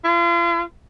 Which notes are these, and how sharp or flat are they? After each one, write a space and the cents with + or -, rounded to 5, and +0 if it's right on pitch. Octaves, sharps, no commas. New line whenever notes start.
F4 -40